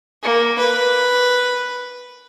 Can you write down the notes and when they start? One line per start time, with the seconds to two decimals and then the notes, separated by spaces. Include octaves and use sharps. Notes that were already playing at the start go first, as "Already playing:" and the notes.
0.23 A#3
0.59 B4